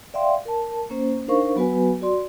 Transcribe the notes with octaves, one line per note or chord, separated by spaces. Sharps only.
D5 E5 F5 G5 C6
A#4 A5
A#3 C#4 C5
D4 D#4 A#4 C5 F5 C#6
F#3 B3 F#4 B4 G#5
F#4 D5 C6